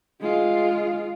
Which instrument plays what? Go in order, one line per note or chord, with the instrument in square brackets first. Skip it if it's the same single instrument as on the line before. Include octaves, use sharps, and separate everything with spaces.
[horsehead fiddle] G#3 F4